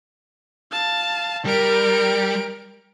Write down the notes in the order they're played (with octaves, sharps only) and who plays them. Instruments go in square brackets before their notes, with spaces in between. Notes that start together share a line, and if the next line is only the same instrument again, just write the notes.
[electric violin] F5 A5
[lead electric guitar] G3 [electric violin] A#4 D7